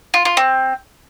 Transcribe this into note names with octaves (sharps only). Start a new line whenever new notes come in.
F4
F4
C4